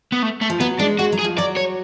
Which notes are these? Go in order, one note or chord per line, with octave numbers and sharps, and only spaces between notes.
B3
A3
A3
F3
F#3 B3
G#3 D4
G#3 F#4
F#3
G#4
F3
F#3 D5
C#5